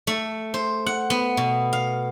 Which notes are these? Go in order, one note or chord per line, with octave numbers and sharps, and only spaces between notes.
A3
C5
F#5
B3
B2
F5